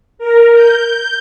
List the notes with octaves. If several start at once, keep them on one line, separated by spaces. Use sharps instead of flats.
A#4
G6